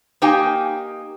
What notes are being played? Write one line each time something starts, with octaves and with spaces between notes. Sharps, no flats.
A#3 D#4 G4 G5 G#5